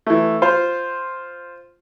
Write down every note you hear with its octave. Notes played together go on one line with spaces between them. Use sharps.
E3 A3
F4 C5